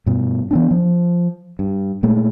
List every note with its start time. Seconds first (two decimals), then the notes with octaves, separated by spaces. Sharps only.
0.06 G2 B2
0.51 E3 B3 D4
0.71 F3
1.59 G2
2.03 A#2 G#3 A3